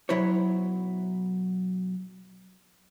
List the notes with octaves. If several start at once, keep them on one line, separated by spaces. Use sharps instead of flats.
B1 F#3 E4 C5 C#5